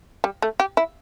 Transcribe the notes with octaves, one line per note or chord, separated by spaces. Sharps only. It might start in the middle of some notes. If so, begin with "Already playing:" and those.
G3
A3
G4
E4